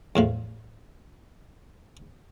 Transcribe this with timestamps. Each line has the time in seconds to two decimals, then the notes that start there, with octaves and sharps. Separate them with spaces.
0.16 E2 A2 F3